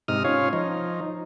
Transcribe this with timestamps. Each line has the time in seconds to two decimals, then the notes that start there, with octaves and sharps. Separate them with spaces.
0.08 G#2 C3 D#4 D#6 F6
0.24 C#4 F4 C#5 F5
0.53 F3 D#4